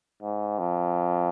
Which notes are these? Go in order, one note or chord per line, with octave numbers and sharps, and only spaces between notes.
G#2
F2